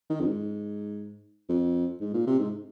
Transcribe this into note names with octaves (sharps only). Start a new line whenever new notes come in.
D#3
F2
G#2
F2
G#2
A#2
C3
G#2